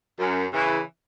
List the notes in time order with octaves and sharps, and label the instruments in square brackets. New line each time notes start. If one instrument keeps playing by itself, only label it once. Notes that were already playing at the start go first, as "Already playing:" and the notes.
[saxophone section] F#2
C#3 E3